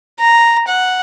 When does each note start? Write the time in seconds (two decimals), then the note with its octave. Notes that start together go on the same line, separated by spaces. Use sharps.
0.19 A#5
0.68 F#5